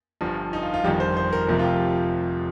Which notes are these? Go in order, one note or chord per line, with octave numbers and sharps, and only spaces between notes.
G1 G2 F3
D#4
F4
F4
G1 F2 D#3 G4
C5
C5
A#4
F1 F2 C3 F3 A#4
F4
G4